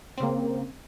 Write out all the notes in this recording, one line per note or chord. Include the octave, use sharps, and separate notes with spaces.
C#3 A#3 C4